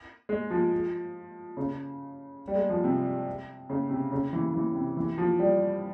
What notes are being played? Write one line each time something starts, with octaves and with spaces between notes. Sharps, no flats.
G#3
F3
C#3
G3
G#3
F3
C3
C#3
C3
C#3
E3
E3
C3
E3
F3
G3